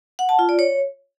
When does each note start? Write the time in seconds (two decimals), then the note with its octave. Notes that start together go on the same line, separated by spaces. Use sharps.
0.19 F#5
0.29 A5
0.39 F4
0.49 D5
0.59 C#5